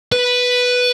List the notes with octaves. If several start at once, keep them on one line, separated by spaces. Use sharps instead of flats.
B4